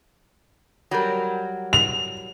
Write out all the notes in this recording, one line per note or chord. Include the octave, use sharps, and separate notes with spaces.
F#3 G3 A#4
F7